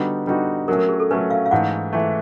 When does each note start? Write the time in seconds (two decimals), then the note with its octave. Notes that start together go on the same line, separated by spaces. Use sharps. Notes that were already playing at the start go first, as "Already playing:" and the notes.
Already playing: D3 G3 B3 D#4 F#4
0.27 D3 G3 B3 D#4 F#4
0.68 F#3 A3 C#4 A#4
0.79 A#4
0.89 G#4
1.00 A4
1.11 F#3 A3 C#4 B4
1.31 F5
1.46 F5
1.51 G#2 E3 A3 F#5
1.93 E3 A3